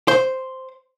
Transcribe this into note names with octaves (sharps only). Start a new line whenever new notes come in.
C5